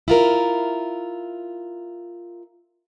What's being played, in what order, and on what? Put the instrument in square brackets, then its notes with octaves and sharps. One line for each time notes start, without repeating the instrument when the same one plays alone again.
[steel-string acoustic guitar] E4 F4 A#4